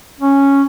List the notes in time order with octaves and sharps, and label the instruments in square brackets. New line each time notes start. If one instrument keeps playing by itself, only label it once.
[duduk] C#4